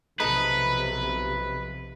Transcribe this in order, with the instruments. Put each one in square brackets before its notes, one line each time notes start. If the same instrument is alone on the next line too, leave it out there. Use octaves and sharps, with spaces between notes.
[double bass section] B1 C3 F3 [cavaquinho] D#4 A4 B5 [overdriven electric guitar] B4